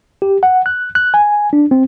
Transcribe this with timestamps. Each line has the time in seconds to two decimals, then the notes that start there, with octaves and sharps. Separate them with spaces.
0.22 G4
0.43 F#5
0.66 F#6
0.95 F#6
1.14 G#5
1.53 D4
1.71 C4